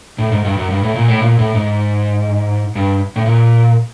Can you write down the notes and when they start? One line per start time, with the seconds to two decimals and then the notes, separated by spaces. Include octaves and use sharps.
0.18 A2
0.32 G#2
0.45 G2
0.57 F#2
0.70 G2
0.83 A2
0.95 A#2
1.08 A2
1.21 A#2
1.39 A2
1.55 G#2
2.75 G2
3.16 A2
3.26 A#2